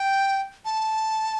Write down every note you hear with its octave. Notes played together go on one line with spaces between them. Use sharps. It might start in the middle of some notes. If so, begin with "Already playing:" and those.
Already playing: G5
A5